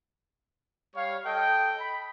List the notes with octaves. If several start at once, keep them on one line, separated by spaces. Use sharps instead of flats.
G3 C#5 F5
A4 D#5 G5
B5